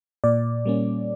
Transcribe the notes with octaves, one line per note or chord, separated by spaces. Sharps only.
A#2 D5
G3 A#3 C#4